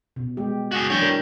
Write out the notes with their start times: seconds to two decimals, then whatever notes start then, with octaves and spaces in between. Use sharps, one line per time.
0.16 B2
0.37 G#3 G4
0.72 F#4 G#4
0.90 E3 F#3 D4 C#5 G5
1.02 A#4